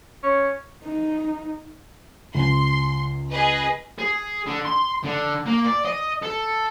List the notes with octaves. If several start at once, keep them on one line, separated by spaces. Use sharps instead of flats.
C#4
D#4
C#2 C6
G#4 B4 D#5
G#4
D3
C6
D3
A#3
D5
D#5
A4